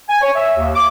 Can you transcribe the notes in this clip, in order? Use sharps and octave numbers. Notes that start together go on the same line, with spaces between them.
G#5
C#5
E5
D#2
D6